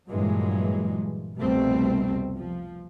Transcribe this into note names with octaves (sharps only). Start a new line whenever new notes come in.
G2 A#2 E3 F#3 G#3
F1 C2 B2 G3 A3 C4
F3